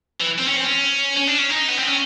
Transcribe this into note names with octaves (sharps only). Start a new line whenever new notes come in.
E3
C4
C#4
C4
C#4
C#4
D4
C#4
D#4
B3
C4
C#4